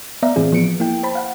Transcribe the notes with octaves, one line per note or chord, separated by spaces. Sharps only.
B3 D5 E5 F5 A#5
A2 E3 C4 G#4
F3 B3 C#7 D7
A#3 E4 G5
C5 A5 B5
F5 F#5